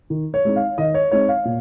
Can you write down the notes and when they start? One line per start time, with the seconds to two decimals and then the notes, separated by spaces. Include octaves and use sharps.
0.10 D#3
0.34 C#5
0.45 G#3 C4 D#4
0.56 F5
0.78 D#3 D#5
0.94 C#5
1.11 G#3 C4 D#4 C#5
1.29 F5
1.45 A#2